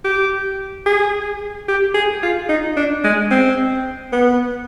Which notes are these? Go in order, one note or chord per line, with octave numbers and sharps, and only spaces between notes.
G4
G#4
G4
G#4
F4
D#4
D4
G#3
C4
B3